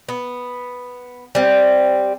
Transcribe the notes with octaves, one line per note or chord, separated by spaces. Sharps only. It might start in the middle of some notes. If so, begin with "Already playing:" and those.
B3
G3 C4